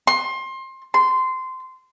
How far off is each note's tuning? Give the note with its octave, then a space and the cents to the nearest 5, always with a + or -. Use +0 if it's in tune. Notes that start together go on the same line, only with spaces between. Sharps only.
C6 +25
C6 -15